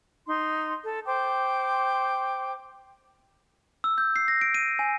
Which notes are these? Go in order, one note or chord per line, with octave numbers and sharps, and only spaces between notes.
D#4 C6
A4
C5 G5 D6
E6
G6
C7
A#6
D7
D#7
G#5